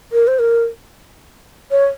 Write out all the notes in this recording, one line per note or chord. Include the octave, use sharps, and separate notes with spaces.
A#4
C5
A#4
C#5